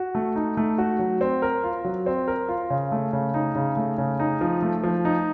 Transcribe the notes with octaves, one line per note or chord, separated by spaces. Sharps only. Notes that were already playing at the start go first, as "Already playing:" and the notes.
Already playing: F#4
A3
D#4
A3
F#4
F#3
C4
A#4
F4
F#3
C4
A#4
F4
C#3
A3
C#3
D#4
C#3
A3
C#3
D#4
F3
A3
F3
D#4